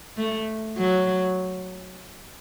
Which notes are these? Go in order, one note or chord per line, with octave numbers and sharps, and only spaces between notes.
A3
F#3